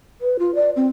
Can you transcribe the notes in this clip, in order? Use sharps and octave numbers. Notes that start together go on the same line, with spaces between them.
B4
F4
D5
C4